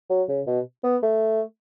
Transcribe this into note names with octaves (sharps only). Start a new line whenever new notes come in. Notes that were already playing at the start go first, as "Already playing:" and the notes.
F#3
C#3
B2
B3
A3